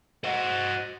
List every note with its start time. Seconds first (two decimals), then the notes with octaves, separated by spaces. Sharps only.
0.24 F#4 C5 D#5 F#5